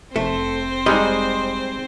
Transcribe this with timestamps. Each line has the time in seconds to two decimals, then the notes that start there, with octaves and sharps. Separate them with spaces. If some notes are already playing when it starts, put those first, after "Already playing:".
0.16 F1 A3 C4 C5
0.86 G3 G#3 D#4 D#5